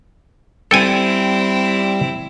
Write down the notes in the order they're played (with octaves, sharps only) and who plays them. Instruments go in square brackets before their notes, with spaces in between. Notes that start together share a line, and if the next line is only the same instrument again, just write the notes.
[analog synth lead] G3 [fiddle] C4 E4 [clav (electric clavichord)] A4 G5 G#5